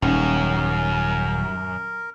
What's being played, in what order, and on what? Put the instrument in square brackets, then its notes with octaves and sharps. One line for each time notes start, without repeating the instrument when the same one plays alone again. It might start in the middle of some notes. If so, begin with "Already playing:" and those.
[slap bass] D#1 [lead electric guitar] F#2 [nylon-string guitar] G3 C#4 D#4 [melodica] A#4